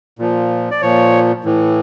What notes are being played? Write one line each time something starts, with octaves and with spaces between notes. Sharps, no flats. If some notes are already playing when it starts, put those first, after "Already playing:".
A#2 F3
D5
A#2 F3 C#5
A2 E3